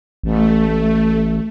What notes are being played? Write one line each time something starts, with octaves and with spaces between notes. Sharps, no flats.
A1 A3